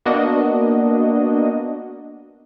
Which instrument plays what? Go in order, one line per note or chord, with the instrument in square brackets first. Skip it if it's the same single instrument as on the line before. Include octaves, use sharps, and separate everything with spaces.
[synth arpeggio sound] A#3 B3 D4 F#4 D#5